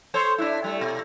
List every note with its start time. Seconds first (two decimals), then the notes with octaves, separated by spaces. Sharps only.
0.14 A4 C5 C#5
0.38 D4 E4
0.64 G3 A3
0.81 B2